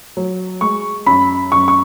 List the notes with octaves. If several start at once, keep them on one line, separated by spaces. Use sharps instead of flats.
F#3
G#3 C#6
F#2 B5
F#2 C#6
C#6